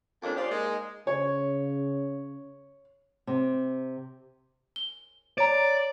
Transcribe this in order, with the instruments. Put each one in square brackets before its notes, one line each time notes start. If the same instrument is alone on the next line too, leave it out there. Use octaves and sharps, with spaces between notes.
[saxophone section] F2 D#3 A#3 C#4 D4
F4 G4 G#4 C5 D5
G#3 A#3 D#4 D#5
[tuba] C#3 [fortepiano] C#5
[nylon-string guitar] C3
[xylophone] G7
[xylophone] C#5 A#5 [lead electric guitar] D5